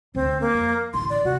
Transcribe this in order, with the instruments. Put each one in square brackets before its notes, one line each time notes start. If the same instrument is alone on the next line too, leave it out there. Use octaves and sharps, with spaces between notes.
[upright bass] D2 [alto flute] C4
[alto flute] A#3
[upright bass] F2
[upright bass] A1 D2 [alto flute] C6
[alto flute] D5
[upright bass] C3 [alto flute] F#4